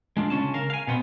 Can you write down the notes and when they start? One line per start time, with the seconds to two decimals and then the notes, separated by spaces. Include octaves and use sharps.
0.17 G#3 D4 F4
0.30 C#3 C4 C#4 A5
0.54 A#4 F5
0.70 F5 G#5
0.87 B2 B3 C4